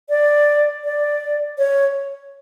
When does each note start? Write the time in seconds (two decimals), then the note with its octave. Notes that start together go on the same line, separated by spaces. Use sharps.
0.09 D5
0.84 D5
1.58 C#5